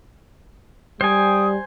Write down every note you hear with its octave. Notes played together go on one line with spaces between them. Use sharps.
G3 C5 G5 G#5 D#6